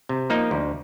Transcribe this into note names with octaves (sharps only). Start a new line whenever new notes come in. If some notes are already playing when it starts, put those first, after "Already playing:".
C3
F3 A#3 D#4
D2